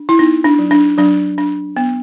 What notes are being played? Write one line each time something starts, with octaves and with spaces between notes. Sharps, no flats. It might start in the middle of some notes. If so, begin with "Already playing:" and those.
Already playing: D4
E4
B3 D#4
D4
F#3
D4
F#3 D4
D4
B3